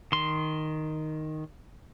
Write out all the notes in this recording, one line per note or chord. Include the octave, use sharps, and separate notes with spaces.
D#3 C6